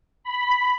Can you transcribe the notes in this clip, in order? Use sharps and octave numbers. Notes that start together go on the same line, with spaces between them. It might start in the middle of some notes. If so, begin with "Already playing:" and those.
B5